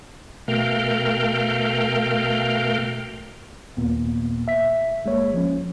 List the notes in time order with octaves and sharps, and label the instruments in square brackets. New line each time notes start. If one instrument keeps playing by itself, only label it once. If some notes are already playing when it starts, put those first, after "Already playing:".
[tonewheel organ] B2 A3 A#4 F5 G5
[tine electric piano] D#2 A#2 A#3 B3
E5 B6
G1 G#3 A#3 C#5
F3 C#4